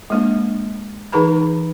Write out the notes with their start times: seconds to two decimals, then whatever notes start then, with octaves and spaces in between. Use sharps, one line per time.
0.10 G#3 A#3 D4
1.12 E3 D#4 G#4 B4 A#5 B5